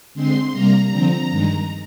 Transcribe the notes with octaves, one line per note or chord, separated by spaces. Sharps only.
D3 G#3 C4 C6
C3 G3 A#3 A#5
D3 F3 C4
G2 D#3 G#3